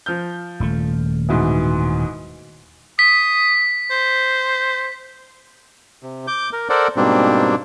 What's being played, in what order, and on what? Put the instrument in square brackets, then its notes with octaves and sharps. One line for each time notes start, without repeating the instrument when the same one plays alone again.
[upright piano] F3 F6 G6
[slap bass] D#1 A3
[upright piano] G#2 B2 E3
[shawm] D#6 [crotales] B6
[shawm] C5
[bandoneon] C3
D6 G6
A#4
A4 A#4 C5 D5 F#5
G#2 B2 G3 A#3 C4 D4